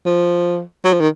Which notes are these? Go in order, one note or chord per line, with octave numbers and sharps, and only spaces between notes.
F3
F#3
F3
D#3